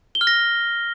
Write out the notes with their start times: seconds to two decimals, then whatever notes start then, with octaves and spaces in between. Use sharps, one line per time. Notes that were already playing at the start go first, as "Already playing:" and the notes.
0.15 G7
0.21 F6
0.27 A#6